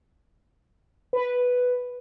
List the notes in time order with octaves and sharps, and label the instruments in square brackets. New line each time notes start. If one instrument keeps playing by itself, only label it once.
[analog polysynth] B4